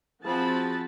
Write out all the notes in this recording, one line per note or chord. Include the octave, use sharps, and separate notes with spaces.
F3 C4 F#4 G#4 A5 B5